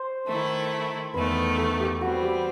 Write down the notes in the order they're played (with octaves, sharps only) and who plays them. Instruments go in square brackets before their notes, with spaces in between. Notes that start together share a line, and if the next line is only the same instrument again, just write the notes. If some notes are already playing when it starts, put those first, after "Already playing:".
Already playing: [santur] C5
[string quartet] D#3 A3 E4
[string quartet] E2 D#3 A3 [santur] B4
[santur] A4
G4
[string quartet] E3 G3 C4 [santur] F#4
[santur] G4